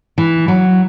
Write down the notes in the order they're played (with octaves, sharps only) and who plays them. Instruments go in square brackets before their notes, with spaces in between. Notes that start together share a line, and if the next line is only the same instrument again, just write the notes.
[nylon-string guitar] E3
F#3